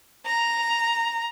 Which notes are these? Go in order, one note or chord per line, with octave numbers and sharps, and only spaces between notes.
A#5